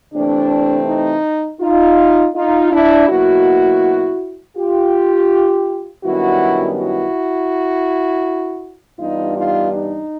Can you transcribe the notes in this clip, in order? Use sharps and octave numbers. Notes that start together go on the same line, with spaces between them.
C3 E3 A3 C4 D4
D#4
D#4 F4
D#4 F4
D4 E4
B2 F#3 A#3 E4 F#4
F4 G4
F#2 D#3 G3 B3 D4 E4 F#4
E4 F#4
G2 E3 G3 B3 D4 D#4 F4
D#4 F4
D#4